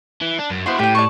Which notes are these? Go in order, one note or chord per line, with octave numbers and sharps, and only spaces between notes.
E3
D4
F#2
B3 E4 F#4 C5 C6
A2 G4 G5
D5 A5 C#6